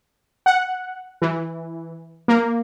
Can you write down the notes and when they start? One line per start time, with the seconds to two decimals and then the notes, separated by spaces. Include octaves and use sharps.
0.46 F#5
1.22 E3
2.28 A#3